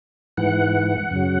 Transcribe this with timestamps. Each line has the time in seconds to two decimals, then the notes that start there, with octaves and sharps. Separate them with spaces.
0.37 G#2 E3 F#5
1.11 F#2 C#3 F#3